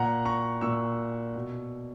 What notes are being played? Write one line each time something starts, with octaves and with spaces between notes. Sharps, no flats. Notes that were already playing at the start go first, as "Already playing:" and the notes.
Already playing: A#2 F#5 A#5
A#5 C#6
A#2 C#6 E6
B2